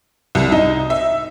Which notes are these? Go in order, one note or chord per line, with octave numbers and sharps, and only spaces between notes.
C2
D#4
E5